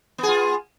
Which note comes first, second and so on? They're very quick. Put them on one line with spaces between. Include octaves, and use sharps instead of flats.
B3 G#4 F4